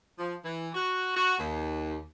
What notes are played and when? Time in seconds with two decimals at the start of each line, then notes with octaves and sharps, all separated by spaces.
0.18 F3
0.44 E3
0.74 F#4
1.16 F#4
1.39 D#2